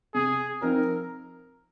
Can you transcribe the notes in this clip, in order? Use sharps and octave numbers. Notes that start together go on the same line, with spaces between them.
C3 G#4
F3 C4 D#4 A#4